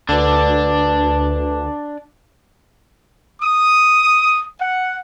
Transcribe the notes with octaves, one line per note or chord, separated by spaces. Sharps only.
D2 D3 D4 B4 D5 A5
D#6
F#5